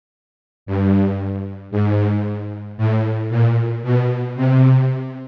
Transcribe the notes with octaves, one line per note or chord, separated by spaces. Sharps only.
G2
G#2
A2
A#2
B2
C3